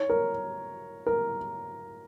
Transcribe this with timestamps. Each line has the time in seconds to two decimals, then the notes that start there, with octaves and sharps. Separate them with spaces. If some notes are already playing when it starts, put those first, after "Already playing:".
Already playing: C#5
0.10 A#4
1.07 A#4